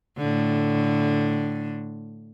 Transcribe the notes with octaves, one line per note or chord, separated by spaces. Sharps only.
A2 D3